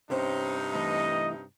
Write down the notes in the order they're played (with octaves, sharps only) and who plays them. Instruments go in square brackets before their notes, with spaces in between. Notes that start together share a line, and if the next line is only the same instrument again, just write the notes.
[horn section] G2 C3 D#4 [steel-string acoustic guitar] C#4 C5 C#5
[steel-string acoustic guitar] E3 A3 [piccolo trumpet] D#5